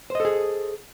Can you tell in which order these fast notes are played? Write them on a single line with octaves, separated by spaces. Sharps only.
C5 D#5 A4 G#4